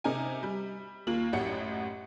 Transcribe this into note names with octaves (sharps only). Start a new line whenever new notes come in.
C3 D#4 A#4 G#5
G3
D#2 A#3 F4 F#7
A1 F#2 A2 G4 F#5 C#7